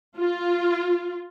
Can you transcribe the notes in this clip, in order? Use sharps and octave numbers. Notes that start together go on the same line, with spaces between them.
F4